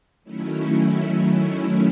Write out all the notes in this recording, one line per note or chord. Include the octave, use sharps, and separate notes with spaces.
D#3 F#3 A3 C#4 E4